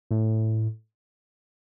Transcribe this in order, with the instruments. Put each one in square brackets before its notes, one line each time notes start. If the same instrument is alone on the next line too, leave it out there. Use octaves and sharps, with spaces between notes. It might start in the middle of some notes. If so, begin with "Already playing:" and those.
[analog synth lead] A2